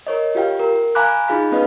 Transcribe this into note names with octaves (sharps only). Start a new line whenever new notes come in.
A#4 C#5 D#5
F4 G4 F5 G5
A#4
F5 G#5 A#5 B5 D6 F#6
D#4 F4 G#4 F5 B5
B3 C#4 B4 D#5 F5